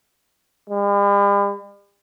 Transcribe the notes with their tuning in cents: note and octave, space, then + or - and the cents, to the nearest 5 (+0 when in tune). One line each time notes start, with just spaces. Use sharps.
G3 +45